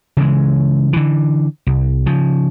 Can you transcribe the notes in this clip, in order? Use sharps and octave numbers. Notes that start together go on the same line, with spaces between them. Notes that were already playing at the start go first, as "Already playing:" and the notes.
C#3 E3 G#3
D3 E3
C2
C#3 F3